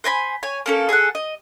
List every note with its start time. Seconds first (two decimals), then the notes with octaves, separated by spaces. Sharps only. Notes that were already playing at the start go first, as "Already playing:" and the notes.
0.04 C5 G#5 A#5 B5
0.43 C#5 G#5
0.66 A#3 C#4 A4
0.89 G#4 A4 E5 F#5
1.15 D#5